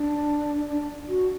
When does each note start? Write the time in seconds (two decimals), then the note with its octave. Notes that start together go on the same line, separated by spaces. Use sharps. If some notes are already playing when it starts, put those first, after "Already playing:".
Already playing: D4
0.69 D4
1.09 F#4